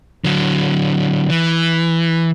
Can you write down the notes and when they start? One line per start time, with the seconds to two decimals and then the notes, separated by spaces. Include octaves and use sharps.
0.24 D3 F#3
1.30 E3